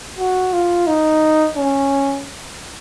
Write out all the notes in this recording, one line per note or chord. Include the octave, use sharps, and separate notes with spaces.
F#4
F4
D#4
C#4